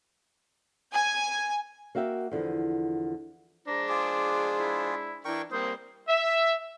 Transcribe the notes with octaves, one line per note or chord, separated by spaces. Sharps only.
G#5
A#3 F#4 E5 F5 G5
E2 D3 F3
G#3 D4 C5 A#5
F4 G#4 D6
E4
E3 D4 A#4 G5 C#6
G3 A#3 C4 C5 D#6
E5